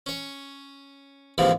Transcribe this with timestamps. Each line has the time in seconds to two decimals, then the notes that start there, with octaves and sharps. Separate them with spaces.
0.06 C#4 C#5
1.38 D#2 G#2 C3 E3 F3